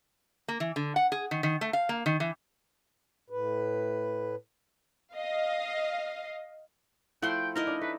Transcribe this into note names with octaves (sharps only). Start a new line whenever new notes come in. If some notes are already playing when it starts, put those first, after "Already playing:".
A#3
E3
D3
F#5
G#4
D#3
D#3
A3
F5
A#3
D#3
E3
A2 B4
D#5 F5
F3 A3 E4 F#5 G5 C6
D#4 E4 A#4 D#5
D4
A3 B4